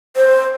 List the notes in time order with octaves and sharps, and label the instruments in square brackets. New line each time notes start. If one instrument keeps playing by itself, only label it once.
[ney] C5